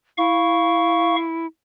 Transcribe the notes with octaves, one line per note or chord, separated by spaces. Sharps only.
E4 F5 C#6